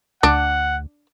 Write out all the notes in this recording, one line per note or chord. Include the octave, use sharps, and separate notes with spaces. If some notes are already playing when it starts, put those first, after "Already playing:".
D2 D4 F#5